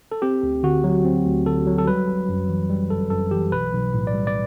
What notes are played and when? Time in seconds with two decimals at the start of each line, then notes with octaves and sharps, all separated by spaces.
0.12 A4
0.22 C4 G4
0.43 D2
0.63 D3 F#4
0.84 F#3
1.05 C4
1.26 D2
1.46 D3 A4
1.67 F#3
1.78 A4
1.87 G3 B4
2.08 G1
2.29 F#2
2.49 E3
2.69 G3
2.90 G1 A4
3.10 F#2 A4
3.31 E3 G4
3.52 B1 B4
3.73 B1
3.94 A2
4.07 D5
4.14 G3
4.27 D5